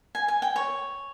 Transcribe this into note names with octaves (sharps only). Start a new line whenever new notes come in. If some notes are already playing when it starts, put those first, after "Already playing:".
G#5
G#5
G5
C#5